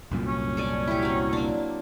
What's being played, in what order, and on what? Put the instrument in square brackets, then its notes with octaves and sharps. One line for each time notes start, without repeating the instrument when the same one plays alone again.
[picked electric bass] C2 F#2 A#2
[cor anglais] C#4
[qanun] A4 D5 G#5
E4 G4
F#3 C4
A#3 D4